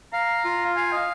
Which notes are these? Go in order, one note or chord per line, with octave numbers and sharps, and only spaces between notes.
F5 A#5
F4
F5 G#5
D#5